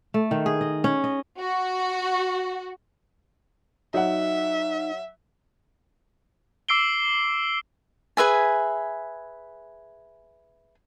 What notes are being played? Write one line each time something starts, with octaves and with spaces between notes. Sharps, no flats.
A3
D#3
G#4
D#5
C#4
D#5
F#4
F#3 D#4 E5 F#5
D6 E6 C7 D7 G7
G#4 B4 E5 G#5